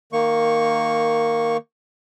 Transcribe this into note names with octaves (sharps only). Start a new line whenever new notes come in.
D#3 A#3 C#6